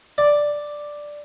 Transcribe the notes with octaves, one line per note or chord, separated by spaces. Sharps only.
D5